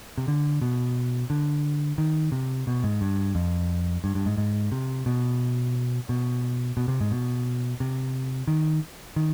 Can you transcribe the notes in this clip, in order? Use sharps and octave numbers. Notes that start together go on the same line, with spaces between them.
C3
D3
B2
D3
D#3
C3
B2
G#2
G2
F2
G2
G2
G#2
G#2
C3
B2
B2
B2
C3
G#2
B2
C3
D#3
D#3